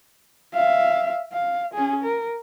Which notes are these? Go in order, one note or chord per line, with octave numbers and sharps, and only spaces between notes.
E5 F5
F5
C#4 G#4
A#4